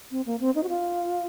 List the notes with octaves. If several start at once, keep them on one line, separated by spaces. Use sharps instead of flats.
C4
A#3
C4
D#4
F#4
F4